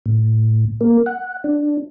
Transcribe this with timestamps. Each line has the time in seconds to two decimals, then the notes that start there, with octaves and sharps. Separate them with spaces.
0.06 A2
0.81 A#3
1.06 F#5
1.44 D4